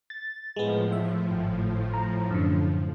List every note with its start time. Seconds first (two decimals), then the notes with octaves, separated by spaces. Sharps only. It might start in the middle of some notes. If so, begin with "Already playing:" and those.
0.10 A6
0.56 A2 F3 G#3 B3
0.92 E5
1.31 G#1
1.94 A#5
2.30 F#2 D3